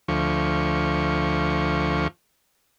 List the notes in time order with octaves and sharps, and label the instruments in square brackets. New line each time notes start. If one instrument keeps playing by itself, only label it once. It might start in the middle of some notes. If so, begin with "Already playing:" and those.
[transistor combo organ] D2 F3 C#6